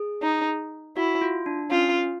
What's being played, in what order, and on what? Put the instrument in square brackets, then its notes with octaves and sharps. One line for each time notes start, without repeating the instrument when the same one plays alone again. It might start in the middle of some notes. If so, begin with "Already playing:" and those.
Already playing: [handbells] G#4
[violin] D#4
[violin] E4 [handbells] F#4
[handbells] F4
D4
[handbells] C#4 [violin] F4